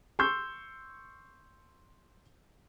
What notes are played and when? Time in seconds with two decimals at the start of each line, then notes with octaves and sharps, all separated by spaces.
0.19 C6 C#6 E6 G6